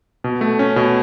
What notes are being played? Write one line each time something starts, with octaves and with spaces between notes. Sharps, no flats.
B2
A3
C#4
B2